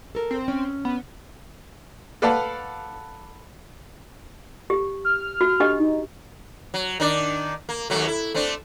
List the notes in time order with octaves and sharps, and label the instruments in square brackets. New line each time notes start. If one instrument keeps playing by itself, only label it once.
[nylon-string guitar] A4 A#4
[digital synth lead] C4
[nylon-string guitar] C#4
[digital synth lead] B3
[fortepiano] A4 B4 D5 F5 F#5 A5
[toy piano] G4
[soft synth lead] F6
[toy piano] F#4
D4 G4 D#5
[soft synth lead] D#4
[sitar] F#3
D#3 D4 D5
A#3
D#2 F#3 A3
E4
A3 C4 D4